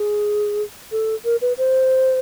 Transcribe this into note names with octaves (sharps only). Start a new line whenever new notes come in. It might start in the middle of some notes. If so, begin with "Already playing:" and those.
Already playing: G#4
A4
A#4
B4
C5